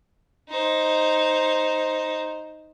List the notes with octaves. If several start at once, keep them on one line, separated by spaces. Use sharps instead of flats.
D#4 C5